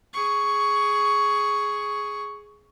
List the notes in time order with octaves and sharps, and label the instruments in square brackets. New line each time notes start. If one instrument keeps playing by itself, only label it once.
[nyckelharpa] G#4 C#6